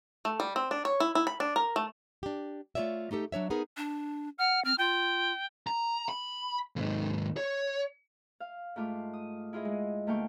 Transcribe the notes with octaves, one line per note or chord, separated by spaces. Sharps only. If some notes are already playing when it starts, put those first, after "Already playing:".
A3
G3
C4
D4
C#5
E4
E4
B5
D4
A#4
A3
D4 G4
A3 F4 G#4 C#5 D5 E5
A3 D#4 G4 A4
F#3 D4 C#5 E5
B3 D#4 G#4 A#4
D4
F#5 F6
C4 F6
F4 G5
A#5
B5
D#2 G#2
C#5
F5
G#2 A3 F4 F5 D6
D#6
E4 F4 G#4 D#5
G#3
D2 A3 A#3 F5 G5 C#6